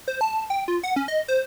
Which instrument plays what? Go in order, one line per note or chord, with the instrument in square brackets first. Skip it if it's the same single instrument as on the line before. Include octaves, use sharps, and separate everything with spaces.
[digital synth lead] C5
A5
G5
F4
F#5
C#4
D#5
C5